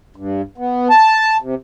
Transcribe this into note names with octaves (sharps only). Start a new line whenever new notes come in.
G2
B3
A5
C3